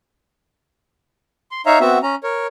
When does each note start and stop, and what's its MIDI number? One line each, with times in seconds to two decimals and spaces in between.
1.51 1.62 84
1.66 1.79 63
1.66 1.79 73
1.66 1.79 76
1.66 1.79 77
1.66 1.79 82
1.80 1.99 59
1.80 1.99 60
1.80 1.99 66
1.80 1.99 76
2.03 2.15 61
2.03 2.15 82
2.23 2.47 70
2.23 2.47 73